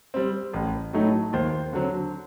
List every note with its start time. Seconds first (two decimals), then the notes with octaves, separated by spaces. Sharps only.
0.14 G3 C4
0.53 A1
0.93 A2 F#3 A3 D#4
1.33 D#2 C5
1.73 D3 F#3 C4